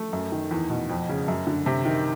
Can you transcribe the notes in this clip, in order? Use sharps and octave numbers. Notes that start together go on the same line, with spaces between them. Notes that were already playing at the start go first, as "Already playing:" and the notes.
Already playing: A3
F#2
D#3
E2
B2
F2
C#3
F#2
D3
C3
D#3